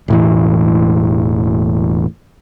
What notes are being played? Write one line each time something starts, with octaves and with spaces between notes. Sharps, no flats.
E1 A2 E3